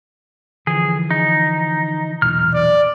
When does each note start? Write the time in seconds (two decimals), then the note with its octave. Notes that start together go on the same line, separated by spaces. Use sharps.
0.67 D3 E3 F3 G#4
1.11 D#4
2.22 B1 E2 A#2 F6
2.54 D5